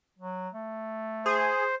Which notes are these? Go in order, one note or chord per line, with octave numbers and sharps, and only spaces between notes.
F#3
A3
G#4 C5